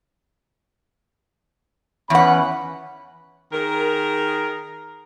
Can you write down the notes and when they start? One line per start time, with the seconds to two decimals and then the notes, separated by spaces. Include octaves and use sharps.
2.10 E2 B3 C#4 F#5 B5
3.53 D#3 G#4 A#4